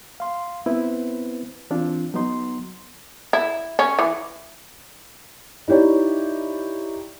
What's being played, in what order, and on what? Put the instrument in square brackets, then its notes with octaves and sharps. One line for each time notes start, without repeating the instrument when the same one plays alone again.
[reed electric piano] F5 C6
B3 C4 E4 B4 C5
E3 C4 D4 F4
F#3 B3 D#4 C6
[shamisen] E4
C#4
E3
[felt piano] D#4 E4 G4 C#5 D5